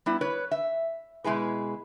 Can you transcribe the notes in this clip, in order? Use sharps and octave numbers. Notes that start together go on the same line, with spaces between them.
G3 B3 E4
B4 C#5
E5
B2 G#3 E4 G#4 B4